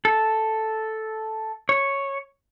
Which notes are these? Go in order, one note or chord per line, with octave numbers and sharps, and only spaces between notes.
A4
C#5